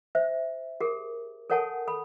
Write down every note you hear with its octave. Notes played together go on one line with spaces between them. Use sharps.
C5 E5
G4 G#4 A#4
A4 A#4 C#5 F#5 G#5 A5
A4 B5